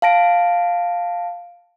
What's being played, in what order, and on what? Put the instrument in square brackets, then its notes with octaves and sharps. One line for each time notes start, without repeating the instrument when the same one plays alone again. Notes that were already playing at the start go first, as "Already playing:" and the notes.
[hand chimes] F5 A5 A#6 D7